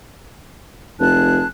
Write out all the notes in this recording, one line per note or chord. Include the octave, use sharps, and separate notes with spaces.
F1 G#4 A5 F#6